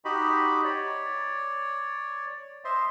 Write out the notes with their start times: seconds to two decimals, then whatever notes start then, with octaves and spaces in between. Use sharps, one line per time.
0.05 D#4 F#4 G4 D#5 B5
0.64 C#5 D5
2.65 C5 D#5 E5 C6